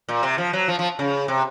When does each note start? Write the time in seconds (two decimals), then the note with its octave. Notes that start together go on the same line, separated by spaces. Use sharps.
0.09 A#2
0.23 C3
0.38 F3
0.53 F#3
0.68 F3
0.79 F3
0.99 C#3
1.28 C3